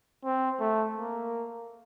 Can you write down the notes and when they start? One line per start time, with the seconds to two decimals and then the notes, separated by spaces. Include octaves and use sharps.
0.24 C4
0.60 A3
0.96 A#3